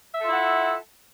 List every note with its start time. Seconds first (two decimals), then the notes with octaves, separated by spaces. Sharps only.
0.15 E5
0.19 A4
0.24 F4
0.28 E4
0.33 F#5